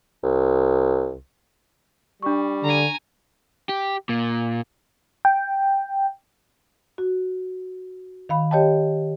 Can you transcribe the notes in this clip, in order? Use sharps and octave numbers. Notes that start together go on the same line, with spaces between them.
C2
G3 D4 C#6
D3 G#5 A#5
G4
A#2
G5
F#4
D#3 F5 B5
G4 C#5 D#5 G5 A5